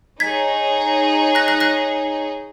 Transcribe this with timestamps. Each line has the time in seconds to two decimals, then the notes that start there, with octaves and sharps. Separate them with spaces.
0.20 D#4 G#4 C#5 G#6 B6
1.35 F#6 A#6
1.48 F#6 A#6
1.60 F#6 A#6